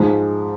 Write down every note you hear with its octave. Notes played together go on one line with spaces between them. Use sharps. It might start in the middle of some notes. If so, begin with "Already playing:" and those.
Already playing: G#2 F3 G#3